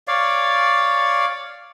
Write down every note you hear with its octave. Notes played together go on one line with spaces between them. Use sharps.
C#5 D5 F5